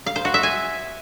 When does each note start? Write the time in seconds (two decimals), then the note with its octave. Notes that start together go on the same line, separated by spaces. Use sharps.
0.06 F5
0.16 C5
0.25 F#4
0.34 E5
0.43 G#5